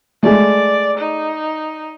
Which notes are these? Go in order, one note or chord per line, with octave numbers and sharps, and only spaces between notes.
G#3 A3 D5
D#4